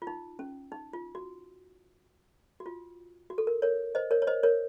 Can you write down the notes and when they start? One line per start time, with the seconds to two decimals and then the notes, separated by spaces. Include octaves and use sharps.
0.02 F4
0.07 D#4
0.39 C#4
0.72 D#4
0.93 F4
1.15 F#4
2.60 F#4
2.66 F4
3.30 F#4
3.38 A4
3.47 A#4
3.62 A#4 C#5
3.95 C5 D#5
4.11 A#4 C#5
4.22 C#5
4.27 C5 D#5
4.43 A#4 C#5